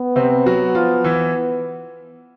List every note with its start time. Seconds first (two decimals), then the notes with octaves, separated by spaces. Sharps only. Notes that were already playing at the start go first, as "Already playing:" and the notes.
Already playing: B3
0.16 C3 C4
0.46 F#3 F#4
0.75 F3 F4
1.04 E3 E4